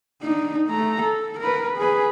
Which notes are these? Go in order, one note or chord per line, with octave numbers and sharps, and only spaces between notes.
D4 D#4
A3 A#5
A4
A#4 B4
G#4 B4